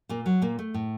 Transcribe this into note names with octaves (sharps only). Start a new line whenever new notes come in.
A#2 A#3
F#3
A#2 A#3
A3
A2